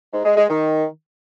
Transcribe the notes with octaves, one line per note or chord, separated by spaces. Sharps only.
G#2
G#3
G#3
D#3